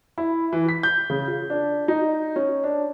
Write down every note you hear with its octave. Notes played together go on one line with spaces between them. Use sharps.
E4
E3
B6
G6
C#3
F4
D4
D#4
C#4
D4